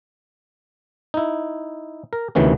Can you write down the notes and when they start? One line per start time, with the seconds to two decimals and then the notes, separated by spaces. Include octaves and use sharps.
1.14 D#4 E4
2.13 A#4
2.35 D2 C3 D#3 E3 B3 C#4